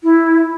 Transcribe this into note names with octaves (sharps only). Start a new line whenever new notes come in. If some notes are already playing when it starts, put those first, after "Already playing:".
E4